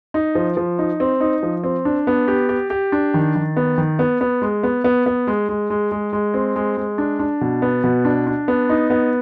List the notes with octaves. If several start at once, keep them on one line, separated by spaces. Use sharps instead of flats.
D#4
F3
F3
D#4
C4
D#4
F3
C4
D4
B3
G4
G4
G4
D4
D#3
D#3
B3
D#3
B3
B3
G#3
B3
B3
B3
G#3
G#3
G#3
G#3
G#3
C4
G#3
G#3
D4
D4
B2
B3
B2
D4
D4
B3
D#4
B3